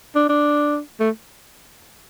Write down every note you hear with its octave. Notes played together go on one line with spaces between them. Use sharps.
D4
D4
A3